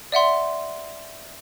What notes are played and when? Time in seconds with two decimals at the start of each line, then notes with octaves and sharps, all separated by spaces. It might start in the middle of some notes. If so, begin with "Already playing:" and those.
0.12 D5 E5 F#5 C6